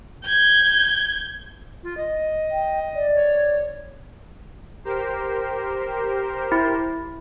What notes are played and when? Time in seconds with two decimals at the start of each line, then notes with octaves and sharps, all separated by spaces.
0.25 G6 G#6
1.83 F4
1.97 D#5
2.51 G5
2.95 D5
3.15 C#5
4.85 G4 A#4 C5
6.52 E4